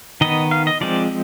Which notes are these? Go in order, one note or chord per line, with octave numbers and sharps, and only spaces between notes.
D#3 B3 D#5
F5
D#5
F3 G#3 C4 D5